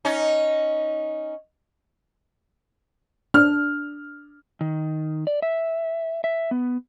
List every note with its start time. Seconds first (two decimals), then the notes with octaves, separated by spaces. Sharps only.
0.05 C#4 D#4
3.34 D4 F6
4.61 D#3
5.27 D5
5.42 E5
6.24 E5
6.51 B3